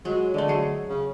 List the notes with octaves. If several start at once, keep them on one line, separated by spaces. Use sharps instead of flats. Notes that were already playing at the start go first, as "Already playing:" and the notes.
F#3 G#3
D3 G#3 A3
F#3 G#4
C#3